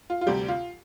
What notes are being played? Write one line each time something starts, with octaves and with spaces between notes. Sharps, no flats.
F4
F4
D2 C3 G3 G4
F4